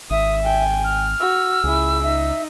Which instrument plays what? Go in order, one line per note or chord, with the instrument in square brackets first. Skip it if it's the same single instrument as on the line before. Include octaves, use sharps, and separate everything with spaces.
[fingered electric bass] G#1 [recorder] E5 [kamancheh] D#6
[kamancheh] G5 G#5
[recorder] F6
[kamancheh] F#4 [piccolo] E6
[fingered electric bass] C#2 [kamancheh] E4 G#4
[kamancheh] D#4 [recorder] E5